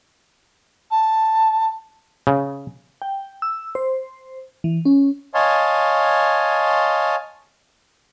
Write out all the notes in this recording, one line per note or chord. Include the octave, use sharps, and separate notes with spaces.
A5
C#3
G5
E6
C5
E3
C#4
C#5 D#5 F5 G#5 A5 C6